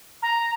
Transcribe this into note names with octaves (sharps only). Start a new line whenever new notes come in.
A#5